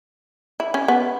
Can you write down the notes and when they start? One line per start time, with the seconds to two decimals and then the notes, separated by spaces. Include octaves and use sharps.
0.60 E4
0.74 C#4
0.88 B3